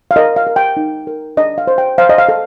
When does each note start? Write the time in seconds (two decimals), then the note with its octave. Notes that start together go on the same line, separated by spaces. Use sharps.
0.11 F5
0.16 A#4 D#5
0.36 F5
0.47 A#4
0.56 G5
0.77 D#4
1.07 A#4
1.37 D4 D#5
1.58 F5
1.67 C5
1.78 G5
1.98 C5 F5
2.09 D#5
2.18 F5
2.29 A4